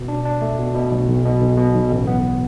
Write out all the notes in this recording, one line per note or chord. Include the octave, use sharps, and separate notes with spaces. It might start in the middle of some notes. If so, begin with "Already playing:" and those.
Already playing: B2
D4
D4
A3
B2
B2
B1
B1
B2
B1
B2
B1
A1
B3